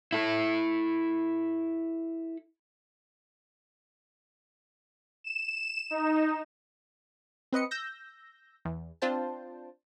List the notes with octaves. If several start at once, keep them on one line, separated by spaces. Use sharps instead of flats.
E4 A4
E7
D#4
C4 B4 D#5 C#7
E6 G6 A#6
E2
C4 D4 F4 C5 G5 A5